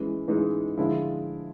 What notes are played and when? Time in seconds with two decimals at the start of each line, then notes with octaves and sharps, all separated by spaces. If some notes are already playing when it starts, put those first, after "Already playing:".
Already playing: E3 G#3 C#4
0.28 E3 G#3 C#4 D#4
0.78 D3 F3 G#3 E4